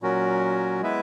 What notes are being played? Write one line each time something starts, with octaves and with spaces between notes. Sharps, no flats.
A#2 F#3 C#4 F#4 A#4
G#3 B3 E4 B4 E5